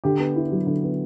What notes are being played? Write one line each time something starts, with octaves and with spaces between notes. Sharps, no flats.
D3 G4
B3
E4
F#3
D3
B3